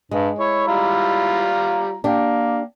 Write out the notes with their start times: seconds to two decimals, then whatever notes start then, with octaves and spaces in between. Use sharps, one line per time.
0.11 G2 G#3
0.39 E4 C#5
0.67 G3 F4 A#5
2.04 A#3 D4 G4